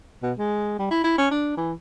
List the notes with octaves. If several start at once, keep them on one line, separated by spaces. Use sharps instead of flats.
B2
G#3
G3
E4
E4
C#4
D4
E3